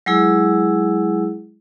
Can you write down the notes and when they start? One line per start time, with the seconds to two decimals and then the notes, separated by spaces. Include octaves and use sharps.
0.06 F#3 G#3 E4 G#4